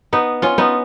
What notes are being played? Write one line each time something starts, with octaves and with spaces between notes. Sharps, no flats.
B3 D#4
C#4 F4
B3 D#4